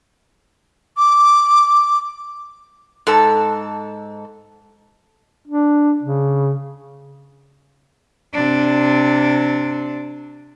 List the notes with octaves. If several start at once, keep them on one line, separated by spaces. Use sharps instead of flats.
D6
G#2 A4 A5
D4
C#3
C3 D4